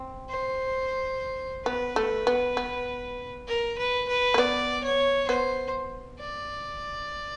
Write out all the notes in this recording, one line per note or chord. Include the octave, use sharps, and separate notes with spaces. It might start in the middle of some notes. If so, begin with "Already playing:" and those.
Already playing: C4
C5
B3 B4
A3
B3
B3
A#4
B4
B4
A#3
B3 D5
C#5
B3 C5
D5